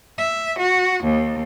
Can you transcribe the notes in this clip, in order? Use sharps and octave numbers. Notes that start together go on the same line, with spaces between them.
E5
F#4
D#2